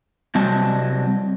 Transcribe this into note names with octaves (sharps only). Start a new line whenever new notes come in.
C3 F#3 G3 C4 D#5 A5